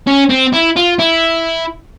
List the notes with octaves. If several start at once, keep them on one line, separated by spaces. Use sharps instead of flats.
C#4
C4
E4
F4
E4